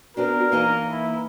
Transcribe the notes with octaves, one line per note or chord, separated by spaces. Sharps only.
B3 C4 D4 F#4 A#4
E3 A#3 D#4 F5
E4